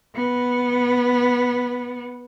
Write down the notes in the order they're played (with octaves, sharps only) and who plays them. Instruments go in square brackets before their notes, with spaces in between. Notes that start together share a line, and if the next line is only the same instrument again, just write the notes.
[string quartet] B3